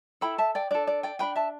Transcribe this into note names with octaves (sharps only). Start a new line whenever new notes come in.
E4 A4 G5 B5
E5 A5
D5 G5
D4 A4 D5
D5
D5 G5
D4 B4 G5 B5
E5 A5